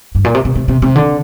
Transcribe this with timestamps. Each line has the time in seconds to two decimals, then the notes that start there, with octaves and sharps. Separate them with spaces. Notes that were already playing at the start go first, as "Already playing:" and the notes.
0.15 G2
0.25 A#2
0.35 C3
0.45 C3
0.55 C3
0.68 C3
0.82 C3
0.96 D3